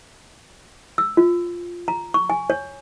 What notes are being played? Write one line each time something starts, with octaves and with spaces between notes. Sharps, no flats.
E6
F4
A#5
C#6
G#5
C#5